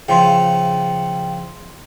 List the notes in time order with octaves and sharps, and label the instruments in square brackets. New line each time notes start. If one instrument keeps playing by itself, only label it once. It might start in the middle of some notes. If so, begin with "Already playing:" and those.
[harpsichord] C#3 F3 E5 [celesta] G5 C6